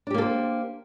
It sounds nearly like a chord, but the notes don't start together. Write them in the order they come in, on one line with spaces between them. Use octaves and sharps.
D4 G4 A#3 A4 C5